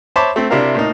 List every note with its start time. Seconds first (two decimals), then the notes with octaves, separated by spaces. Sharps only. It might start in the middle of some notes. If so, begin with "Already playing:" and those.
0.16 C5 C#5 E5 A5 B5 D6
0.36 A3 C4
0.50 C3 D4 E4 A#4 F5
0.75 A2 A#3 D#4